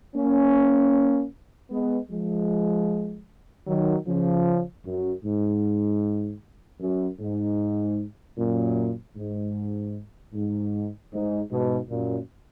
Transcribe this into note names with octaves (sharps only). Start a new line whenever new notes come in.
A#3 C#4
G#3 B3
F3 G#3
D#3 F#3
C#3 F3
F#2
G#2
F#2
G#2
F#2 A#2
G#2
G#2
G#2
G#2 B2
F#2 A#2